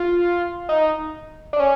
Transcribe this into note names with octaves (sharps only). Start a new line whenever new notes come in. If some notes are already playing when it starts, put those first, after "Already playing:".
Already playing: F4
D#4
D4
C#4